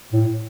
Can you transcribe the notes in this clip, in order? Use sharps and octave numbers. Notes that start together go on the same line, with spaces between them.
A2